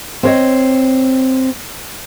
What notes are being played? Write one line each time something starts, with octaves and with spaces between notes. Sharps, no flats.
C4 C#5 D#5